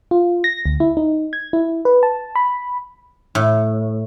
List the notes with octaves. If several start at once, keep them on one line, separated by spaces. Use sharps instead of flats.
F4
A#6
D2
E4
D#4
G#6
E4
B4
A5
B5
A2